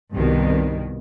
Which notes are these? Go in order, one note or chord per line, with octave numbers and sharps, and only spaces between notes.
C2 G2 B2 D#3